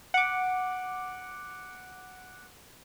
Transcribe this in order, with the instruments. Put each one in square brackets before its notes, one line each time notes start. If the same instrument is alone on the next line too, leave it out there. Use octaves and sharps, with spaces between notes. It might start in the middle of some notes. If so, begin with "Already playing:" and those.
[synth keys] F#5 D6